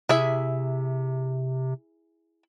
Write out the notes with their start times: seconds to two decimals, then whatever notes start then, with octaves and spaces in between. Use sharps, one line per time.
0.09 C3 E4 G#4 E5